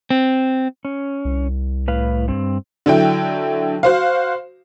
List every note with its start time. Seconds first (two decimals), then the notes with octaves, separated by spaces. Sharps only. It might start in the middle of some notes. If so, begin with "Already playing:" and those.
0.10 C4
0.85 C#4
1.25 C2
1.88 A2 B4 F5
2.28 G2 C4
2.86 D3 F#3 E4 G5
3.83 F#4 C5 F5